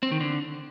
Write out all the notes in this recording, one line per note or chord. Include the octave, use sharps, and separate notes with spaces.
C4
D#3
D3